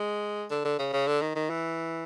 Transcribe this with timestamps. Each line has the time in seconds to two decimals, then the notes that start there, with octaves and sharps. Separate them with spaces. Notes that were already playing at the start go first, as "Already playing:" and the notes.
Already playing: G#3
0.51 D3
0.64 D3
0.79 C#3
0.93 C#3
1.07 D3
1.21 D#3
1.35 D#3
1.50 E3